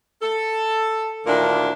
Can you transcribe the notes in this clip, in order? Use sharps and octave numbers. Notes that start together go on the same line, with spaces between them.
A4
D2 A#2 D#3 A#3 D4 E4